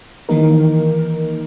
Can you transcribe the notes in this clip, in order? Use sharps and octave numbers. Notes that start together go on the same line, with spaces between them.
D#3 E3 A#3 D#4 A#4